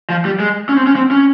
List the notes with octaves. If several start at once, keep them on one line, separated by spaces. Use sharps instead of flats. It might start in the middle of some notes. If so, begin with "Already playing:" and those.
F3
G3
G#3
C#4
C4
C#4
C4
C#4